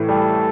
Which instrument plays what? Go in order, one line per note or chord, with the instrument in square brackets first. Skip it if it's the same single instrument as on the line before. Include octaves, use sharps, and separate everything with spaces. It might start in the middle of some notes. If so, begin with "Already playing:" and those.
Already playing: [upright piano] A2 E3
[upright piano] G3 [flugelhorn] A4